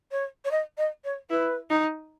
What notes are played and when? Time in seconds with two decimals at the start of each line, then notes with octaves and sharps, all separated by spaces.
0.11 C#5
0.44 C#5
0.51 D#5
0.77 D#5
1.04 C#5
1.30 E4 B4
1.70 D#4